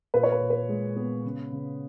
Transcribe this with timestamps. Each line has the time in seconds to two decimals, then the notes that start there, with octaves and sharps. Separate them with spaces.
0.14 A#2 B4
0.23 C#5
0.32 B4
0.40 A#2
0.50 B4
0.69 G#3
0.96 B3
1.25 C#3
1.52 C#3